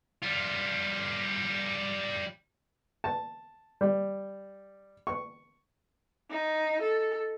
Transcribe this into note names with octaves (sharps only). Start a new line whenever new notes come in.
G3 F4
A5
G3
C#6
D#4
A4